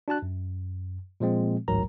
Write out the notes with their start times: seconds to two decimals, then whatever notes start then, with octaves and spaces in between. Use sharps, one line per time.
0.08 D4 F#4 A5 F#6
0.22 F#2
1.20 A#2 F3 G#3 C4
1.68 A1 D2 G#2 F#3 A#4 A#5